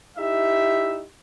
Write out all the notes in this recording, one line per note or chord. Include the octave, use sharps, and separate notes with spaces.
D#4 E4 G4 E5